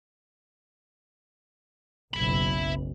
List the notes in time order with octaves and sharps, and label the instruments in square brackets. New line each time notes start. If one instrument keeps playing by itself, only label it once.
[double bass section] F#1 B1 [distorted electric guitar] E5 B5